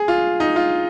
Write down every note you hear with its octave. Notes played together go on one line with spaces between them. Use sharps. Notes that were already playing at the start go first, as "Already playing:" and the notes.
Already playing: G#4
F4
D#4
F4